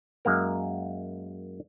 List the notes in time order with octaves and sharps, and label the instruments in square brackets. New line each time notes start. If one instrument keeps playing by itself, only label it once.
[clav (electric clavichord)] F#2 G#3 A#3 A#4